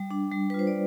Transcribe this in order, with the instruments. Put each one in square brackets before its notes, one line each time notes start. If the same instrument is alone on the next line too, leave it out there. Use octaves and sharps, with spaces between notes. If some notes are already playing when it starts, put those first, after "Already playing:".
Already playing: [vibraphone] G3
D4
G3
B4
F4 C5
D5